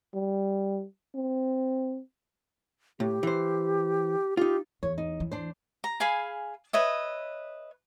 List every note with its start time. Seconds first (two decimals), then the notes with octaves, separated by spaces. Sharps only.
0.14 G3
1.15 C4
3.00 A2 G4
3.23 E3 C5
4.37 D#4 F4 G4
4.83 E2 C#5
4.98 D#4
5.20 E3
5.32 D4 C5
5.84 A#5
6.00 G#4 F5 G#5 B5
6.73 B4 C#5 D#5 E5